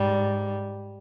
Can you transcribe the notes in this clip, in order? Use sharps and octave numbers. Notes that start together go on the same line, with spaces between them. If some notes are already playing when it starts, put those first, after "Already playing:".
Already playing: G#2 G3